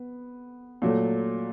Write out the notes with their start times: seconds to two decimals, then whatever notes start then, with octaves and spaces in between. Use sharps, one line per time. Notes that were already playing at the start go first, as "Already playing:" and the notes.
Already playing: B3
0.82 A#2 F#3 A3